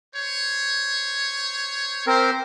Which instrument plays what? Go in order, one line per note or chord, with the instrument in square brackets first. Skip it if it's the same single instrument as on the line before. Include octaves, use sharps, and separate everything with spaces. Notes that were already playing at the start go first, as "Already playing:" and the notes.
[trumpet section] C5 C#5
[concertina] C4 A#4 [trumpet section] G4 C5